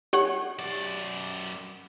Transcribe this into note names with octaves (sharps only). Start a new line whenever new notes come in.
G4 C#5 F#5
F#2 D5